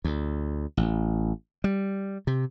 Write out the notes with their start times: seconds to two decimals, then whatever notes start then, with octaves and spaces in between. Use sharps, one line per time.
0.04 D2
0.77 A1
1.64 G3
2.27 C3